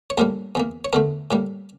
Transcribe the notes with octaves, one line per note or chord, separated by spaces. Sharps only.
C#5
A#1 A2 G3 A#3 A#4
E2 E3 A#3
C#5
E2 D3 A3 A#4
A2 G3 A#3